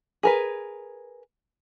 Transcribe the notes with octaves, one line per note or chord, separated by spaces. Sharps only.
G#4 A#4 B4